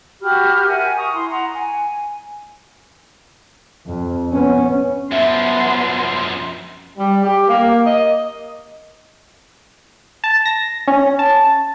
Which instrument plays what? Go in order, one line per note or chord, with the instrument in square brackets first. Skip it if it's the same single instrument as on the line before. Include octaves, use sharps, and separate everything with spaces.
[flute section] F#4 G4 B5 F6
A#4 E5 F#5 G#5
A#5 C#6 D#6
E4 C6
F#5 A#5 C#6
G#5
[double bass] F2
B3 C#4
[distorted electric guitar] F#2 F3 [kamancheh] B3 C6 [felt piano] E5
[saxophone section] G3
G4
A#3
D#5
[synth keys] A5
A#6
C#4
A5